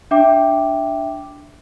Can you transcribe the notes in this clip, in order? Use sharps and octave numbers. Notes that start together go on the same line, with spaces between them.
D4 E5 G5 D6